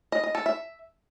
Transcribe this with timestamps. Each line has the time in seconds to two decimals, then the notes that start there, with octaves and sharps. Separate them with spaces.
0.12 D#5
0.23 D#5
0.35 A4
0.46 E5